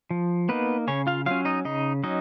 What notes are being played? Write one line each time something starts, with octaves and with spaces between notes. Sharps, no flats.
F3
A#3 B3 D#4 B4
C#3 C#4 C#5
F4 F5
F#3 C#4 F4 F5
D#4 D#5
C#3 D#4 D#5
F#3 C#4 D#4 D#5